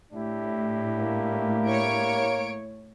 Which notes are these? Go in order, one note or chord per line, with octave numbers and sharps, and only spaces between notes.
A2 D4 E4 G4
A#3
C#5 D7